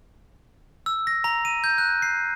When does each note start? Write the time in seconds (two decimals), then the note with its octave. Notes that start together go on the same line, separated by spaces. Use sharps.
0.86 E6
1.07 A#6
1.24 A#5
1.45 D#7
1.64 G6
1.78 F#6
2.02 C7